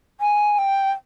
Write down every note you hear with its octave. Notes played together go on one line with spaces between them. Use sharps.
G#5
G5